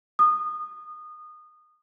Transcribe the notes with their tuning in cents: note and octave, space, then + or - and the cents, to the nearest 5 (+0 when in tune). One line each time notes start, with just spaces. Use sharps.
D#6 -25